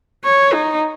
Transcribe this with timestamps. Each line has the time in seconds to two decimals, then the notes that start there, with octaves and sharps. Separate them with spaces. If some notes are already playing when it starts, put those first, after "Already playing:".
0.24 C#5
0.53 D#4